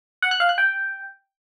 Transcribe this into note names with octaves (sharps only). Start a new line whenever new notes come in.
F#5
F#6
F5
F#6
G5